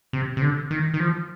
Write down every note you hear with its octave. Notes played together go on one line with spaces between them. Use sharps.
C3
C3
D3
D#3
D#3
F3